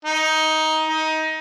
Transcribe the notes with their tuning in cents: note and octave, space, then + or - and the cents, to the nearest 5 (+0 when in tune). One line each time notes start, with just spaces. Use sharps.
D#4 +15
D#4 +20